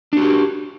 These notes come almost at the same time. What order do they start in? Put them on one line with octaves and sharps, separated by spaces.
D4 F#4 G4